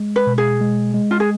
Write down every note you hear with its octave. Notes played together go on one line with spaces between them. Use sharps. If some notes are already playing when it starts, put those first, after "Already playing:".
Already playing: G#3
B4
B2
G#4
G#3
G#3
F4
G#4